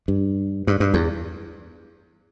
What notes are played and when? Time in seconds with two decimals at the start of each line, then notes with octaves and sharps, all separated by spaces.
0.08 G2
0.67 G2
0.80 G2
0.94 E2